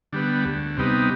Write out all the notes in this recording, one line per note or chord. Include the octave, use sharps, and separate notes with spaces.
D3 G3 B3
D2
C3 G3 B3 D#4